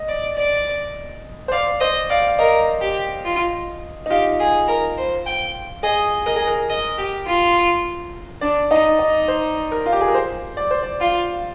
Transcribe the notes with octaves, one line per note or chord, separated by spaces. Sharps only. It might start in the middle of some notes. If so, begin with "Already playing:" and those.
Already playing: D#5
D5
D5
C5
D5 F5
C5 D#5
D5 F5
F5
A#4 D#5
G4
F4
D#4
F4 G4
G#4
A#4
C5
G5
G#4 D#5
A#4 D#5
G#4
A#4
D#5
G4
F4
D4 D5
D#4 D#5
D#4 D#5
C5
A#4
F4
G4
G#4
A#4
C5
D5
C5
D5
F4 F5